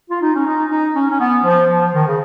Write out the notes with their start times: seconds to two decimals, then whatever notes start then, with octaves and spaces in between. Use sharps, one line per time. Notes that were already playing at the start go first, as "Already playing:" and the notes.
0.10 F4
0.21 D#4
0.35 C#4
0.46 D#4
0.71 D#4
0.95 C#4
1.10 C#4
1.19 B3
1.44 F3
1.69 F3
1.94 D#3
2.07 C#3